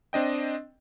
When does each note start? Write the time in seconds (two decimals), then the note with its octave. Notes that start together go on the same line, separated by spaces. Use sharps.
0.13 C4 D4 D#5 G5